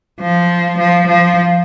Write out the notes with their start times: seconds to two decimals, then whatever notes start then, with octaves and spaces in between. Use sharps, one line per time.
0.21 F3
0.78 F3
1.07 F3